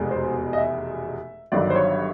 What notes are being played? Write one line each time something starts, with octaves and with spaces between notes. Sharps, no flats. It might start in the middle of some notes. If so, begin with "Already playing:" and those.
Already playing: F1 E2 B2 G#3
C5
D#5
E5
G1 G2 D#3 F#3 D5
C5
C#5